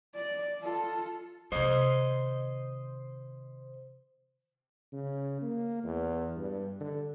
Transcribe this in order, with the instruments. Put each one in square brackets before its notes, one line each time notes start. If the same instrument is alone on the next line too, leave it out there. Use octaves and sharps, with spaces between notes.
[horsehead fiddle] D5
F4 A4
[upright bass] C3 D#3 [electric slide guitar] C5 D#5
[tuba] C#3
A#3
E2
G2
D3